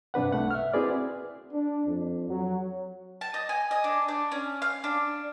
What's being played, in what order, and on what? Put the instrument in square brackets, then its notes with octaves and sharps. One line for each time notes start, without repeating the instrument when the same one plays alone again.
[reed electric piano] G2 C3 D4 B4 F#5
C2 A3 F#5
E5 F6
C4 E4 F#4 G#4 B4 D5
[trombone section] D4
F2
F#3
[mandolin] A5
D#5
G#5
D#5
D4
D4
C#4
F5
D4